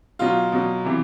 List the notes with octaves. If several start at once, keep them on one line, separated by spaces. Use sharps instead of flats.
B2 F#3 F4
B2 F#3
C3 E3